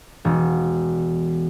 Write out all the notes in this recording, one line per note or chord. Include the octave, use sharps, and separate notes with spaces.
E1